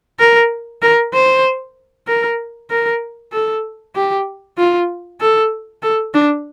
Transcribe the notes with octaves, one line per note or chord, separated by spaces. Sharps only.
A#4
A#4
C5
A#4
A#4
A4
G4
F4
A4
A4
D4